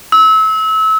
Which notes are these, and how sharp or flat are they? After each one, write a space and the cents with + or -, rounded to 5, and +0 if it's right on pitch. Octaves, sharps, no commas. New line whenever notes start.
E6 -30